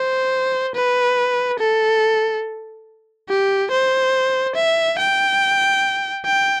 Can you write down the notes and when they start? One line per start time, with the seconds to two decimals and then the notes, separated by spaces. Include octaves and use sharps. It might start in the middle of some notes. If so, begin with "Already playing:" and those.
Already playing: C5
0.75 B4
1.59 A4
3.29 G4
3.71 C5
4.56 E5
4.98 G5
6.25 G5